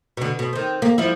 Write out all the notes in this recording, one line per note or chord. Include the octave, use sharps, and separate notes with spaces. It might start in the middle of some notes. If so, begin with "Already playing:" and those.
B2 D3
B2
D#3 C4
A#3
F3 G3 E4